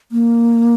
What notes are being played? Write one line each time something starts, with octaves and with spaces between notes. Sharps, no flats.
A#3